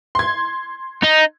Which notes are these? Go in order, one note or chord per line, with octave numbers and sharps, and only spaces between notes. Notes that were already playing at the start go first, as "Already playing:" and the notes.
C6 G#6
D#4